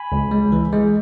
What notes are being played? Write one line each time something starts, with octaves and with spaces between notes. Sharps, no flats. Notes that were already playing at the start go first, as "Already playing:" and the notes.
Already playing: G#5 B5
C#2
G#3
E3
G#3